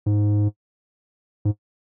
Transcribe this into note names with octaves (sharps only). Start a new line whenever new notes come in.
G#2
G#2